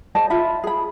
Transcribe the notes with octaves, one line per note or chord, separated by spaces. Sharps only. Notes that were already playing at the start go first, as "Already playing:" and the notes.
G#4 C5 D#5 A5
F4 E5 B5
G#4 B5